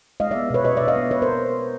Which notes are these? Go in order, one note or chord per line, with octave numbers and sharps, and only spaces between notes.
G#3 D#5 F5
B3 D5 E5
B2 B4 C#5
B2 C#5 D#5
B2 D5 E5
D#5 F5
B3
B3 B4 C#5
A#4 C5